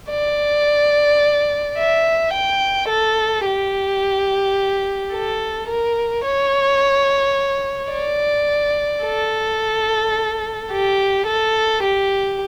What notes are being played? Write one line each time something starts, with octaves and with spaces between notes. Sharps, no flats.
D5
E5
G5
A4
G4
A4
A#4
C#5
D5
A4
G4
A4
G4